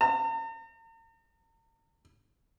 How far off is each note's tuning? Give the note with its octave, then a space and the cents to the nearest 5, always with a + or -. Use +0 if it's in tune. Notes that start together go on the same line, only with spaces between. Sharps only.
A#5 -45